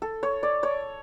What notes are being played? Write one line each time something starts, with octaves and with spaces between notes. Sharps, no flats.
A4
C#5
D5
C#5